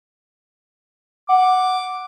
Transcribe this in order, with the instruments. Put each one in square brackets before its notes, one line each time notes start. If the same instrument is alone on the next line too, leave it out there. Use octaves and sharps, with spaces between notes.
[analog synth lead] F#5 [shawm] D6